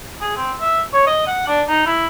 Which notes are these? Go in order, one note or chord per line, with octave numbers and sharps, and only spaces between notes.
G#4
C4
E5
C#5
D#5
F#5
D4
D#4
E4